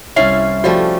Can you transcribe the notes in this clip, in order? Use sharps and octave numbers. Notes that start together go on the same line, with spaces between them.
C2 C#4 E4 E5 F5 C7
F3 G3 A3 F#4